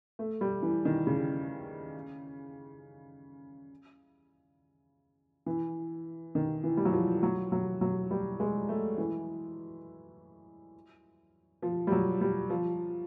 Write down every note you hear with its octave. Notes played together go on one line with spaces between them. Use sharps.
A3
G3
E3
D#3
C#3
E3
D#3
E3
G3
F#3
F3
F#3
F#3
F#3
G3
G#3
A3
E3
F3
G3
F#3
G3
F3